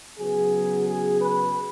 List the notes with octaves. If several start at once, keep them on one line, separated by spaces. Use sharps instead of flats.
C#3 F#3 B3 G#4
G#4
B4